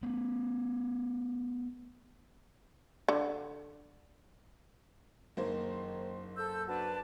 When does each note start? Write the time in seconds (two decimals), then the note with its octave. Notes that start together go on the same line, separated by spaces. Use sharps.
0.03 A3 B3
3.08 D3
5.37 F#1 D#3 A#3 C5
6.37 A4 E6 G6
6.68 D4 F#4 B4 A5